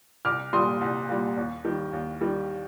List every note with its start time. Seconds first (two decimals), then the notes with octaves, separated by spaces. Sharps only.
0.25 C2 D6 F6
0.53 A#2 G3 C6 D#6
0.81 C2
1.09 A#2 G3
1.37 D#2
1.65 D#3 G3
1.93 D#2
2.21 D#3 G3